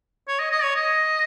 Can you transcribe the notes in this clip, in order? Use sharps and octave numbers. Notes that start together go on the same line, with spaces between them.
C#5
D#5
D#5
C#5
D#5